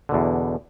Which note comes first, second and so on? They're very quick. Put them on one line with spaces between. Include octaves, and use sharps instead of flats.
D3 B2 E2